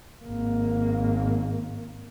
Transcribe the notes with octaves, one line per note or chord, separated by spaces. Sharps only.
G#1 A#3